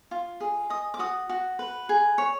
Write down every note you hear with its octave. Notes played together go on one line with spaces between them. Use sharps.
F4
G#4
D#5 D#6
D6
F#4 D#6
F#4
B4
G#4
C#5